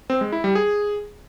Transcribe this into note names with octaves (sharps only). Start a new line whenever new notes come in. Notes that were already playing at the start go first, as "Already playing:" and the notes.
C4
G#3
E4
G3
G#4